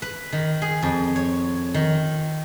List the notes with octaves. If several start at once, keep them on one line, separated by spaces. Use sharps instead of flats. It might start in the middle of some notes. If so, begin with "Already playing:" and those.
B4
D#3
G#4
F2
C#5
D#3